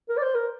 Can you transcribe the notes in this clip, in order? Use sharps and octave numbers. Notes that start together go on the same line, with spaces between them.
A#4
D5
C5
A#4